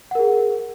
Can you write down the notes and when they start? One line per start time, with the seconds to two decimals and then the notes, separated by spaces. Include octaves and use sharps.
0.11 F#5
0.15 A#4
0.19 G#4